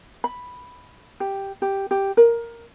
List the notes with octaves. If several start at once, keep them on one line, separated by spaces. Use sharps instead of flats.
B5
G4
G4
G4
A#4